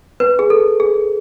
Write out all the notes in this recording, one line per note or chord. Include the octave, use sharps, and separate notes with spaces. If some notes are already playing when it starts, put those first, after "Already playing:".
B4
G#4
A4
G#4